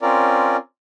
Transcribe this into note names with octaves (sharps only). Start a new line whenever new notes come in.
C4 C#4 F4 A#4 D5